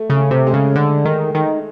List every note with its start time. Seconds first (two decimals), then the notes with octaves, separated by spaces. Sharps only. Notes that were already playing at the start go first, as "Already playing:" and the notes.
Already playing: A3
0.10 C#3
0.17 A3
0.31 C3
0.47 G#3
0.54 C#3
0.76 D3
1.05 D#3
1.35 D#3